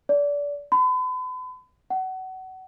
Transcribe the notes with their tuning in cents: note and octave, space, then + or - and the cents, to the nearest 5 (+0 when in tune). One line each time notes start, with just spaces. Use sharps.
D5 -25
B5 +40
F#5 +25